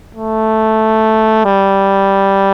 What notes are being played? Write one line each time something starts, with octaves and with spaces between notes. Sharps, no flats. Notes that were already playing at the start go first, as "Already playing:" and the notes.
A3
G3